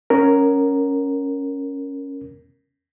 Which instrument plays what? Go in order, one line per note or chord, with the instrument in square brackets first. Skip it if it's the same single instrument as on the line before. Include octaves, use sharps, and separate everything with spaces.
[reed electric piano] C#4 A#4